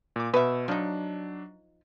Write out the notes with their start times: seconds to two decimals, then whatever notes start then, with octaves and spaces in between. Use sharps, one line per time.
0.16 A#2 D6
0.34 B2 B4 E5
0.68 F3 F#3 D4 D#4